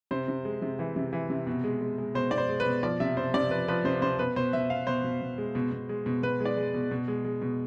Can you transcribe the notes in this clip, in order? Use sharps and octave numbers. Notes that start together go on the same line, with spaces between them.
C3 C5
C3
G#3
C3
E3
C3
E3
C3
B2
G#3
G#3
G#3
B2 C5
B2 D5
C5
G#3
B4
B2
F3 D5
C3 E5
C3 C5
C3 D5
F3 B4
F3 B4
C3 C5
C3 C5
B2 B4
B2 C5
B2 E5
B2 F5
B2 C5
B2
B2
G#3
B2
B2
G#3
B2
B2 B4
G#3
D5
G#3
B2
B2
G#3
G#3
B2